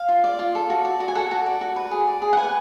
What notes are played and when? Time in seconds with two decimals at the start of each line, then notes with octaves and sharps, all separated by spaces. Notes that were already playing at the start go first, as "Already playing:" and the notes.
Already playing: F5
0.08 F4
0.24 D5
0.39 F4
0.55 A4
0.70 F#4
0.85 D5
1.00 F#4
1.08 G#5
1.15 A4 F#5
1.31 F#4
1.46 D5
1.61 F#4
1.76 B4
1.91 G#4
2.07 D5
2.22 G#4
2.33 F#5
2.37 B4 G#5